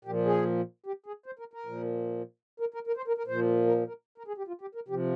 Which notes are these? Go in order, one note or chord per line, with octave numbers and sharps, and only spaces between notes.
A#2 F3 G4
G#4
G4
G#4
C5
A#4
A#4
A#2 F3
A#4
A#4
A#4
C5
A#4
A#4
A#2 F3 C5
A#4
A#4
A#4
G#4
G4
F4
G4
A#4
C3 F3 G4